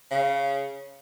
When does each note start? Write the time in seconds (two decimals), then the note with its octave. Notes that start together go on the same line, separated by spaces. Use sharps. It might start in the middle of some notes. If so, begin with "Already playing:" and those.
0.11 C#3